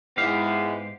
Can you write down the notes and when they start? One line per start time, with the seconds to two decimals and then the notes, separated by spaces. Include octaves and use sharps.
0.17 G#2 G#3 B3 E4 G4 F5